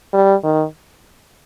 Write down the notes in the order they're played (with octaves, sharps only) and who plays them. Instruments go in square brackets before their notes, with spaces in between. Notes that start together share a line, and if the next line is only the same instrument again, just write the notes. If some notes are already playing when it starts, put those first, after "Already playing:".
[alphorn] G3
D#3